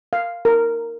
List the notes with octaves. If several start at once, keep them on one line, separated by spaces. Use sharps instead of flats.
F5
A#4